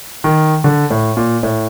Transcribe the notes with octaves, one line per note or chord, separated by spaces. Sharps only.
D#3
D3
A2
A#2
A2